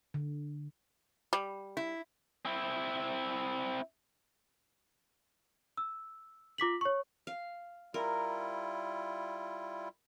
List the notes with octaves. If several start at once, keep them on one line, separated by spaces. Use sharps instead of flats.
D3
G3
E4
C4 E4
E6
F4 D6 B6 F#7
C#5 C#6
F5
G3 E4 F4 A#4